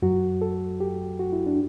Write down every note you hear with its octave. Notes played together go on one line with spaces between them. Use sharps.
F#2 F#3 F#4
A4
G4
F#4
E4
D4